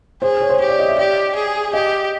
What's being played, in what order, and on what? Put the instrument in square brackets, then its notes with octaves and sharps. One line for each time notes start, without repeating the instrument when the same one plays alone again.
[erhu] G#4 [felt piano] C5
[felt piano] C#5
C5
[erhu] G4 [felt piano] C#5
[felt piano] D5
D#5
E5
[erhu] G4 [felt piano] D5
[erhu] G#4
[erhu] G4 [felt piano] D#5